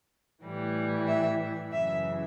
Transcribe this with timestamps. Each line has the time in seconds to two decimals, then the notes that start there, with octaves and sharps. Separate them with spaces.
0.43 A2 E3 G3
1.08 E5
1.71 F#2 C#3 E3 E5